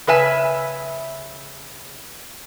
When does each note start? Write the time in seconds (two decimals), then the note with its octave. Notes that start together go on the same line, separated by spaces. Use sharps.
0.07 C#3 B4 E5 G#5